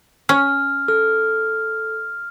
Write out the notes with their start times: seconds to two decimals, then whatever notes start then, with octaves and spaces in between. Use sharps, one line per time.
0.29 C#4 F6
0.88 A4 F6